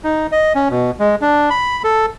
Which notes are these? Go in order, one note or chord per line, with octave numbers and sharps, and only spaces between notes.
D#4
D#5
C#4
B2
G#3
D4
B5
A4